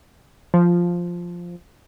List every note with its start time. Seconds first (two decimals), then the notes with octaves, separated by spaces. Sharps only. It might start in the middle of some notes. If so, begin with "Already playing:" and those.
0.54 F3